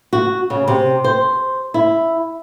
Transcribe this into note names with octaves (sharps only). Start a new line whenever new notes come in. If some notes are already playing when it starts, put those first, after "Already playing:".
F#4
C#3
C3
C5
E4